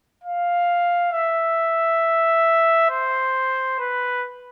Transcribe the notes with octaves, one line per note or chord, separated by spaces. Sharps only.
F5
E5
C5
B4